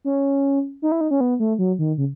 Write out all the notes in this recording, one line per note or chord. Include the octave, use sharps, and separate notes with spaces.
C#4
D#4
E4
D#4
C#4
B3
A3
F#3
D#3
C#3